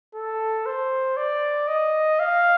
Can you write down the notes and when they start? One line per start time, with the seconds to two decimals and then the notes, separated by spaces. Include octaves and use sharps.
0.15 A4
0.66 C5
1.17 D5
1.68 D#5
2.19 F5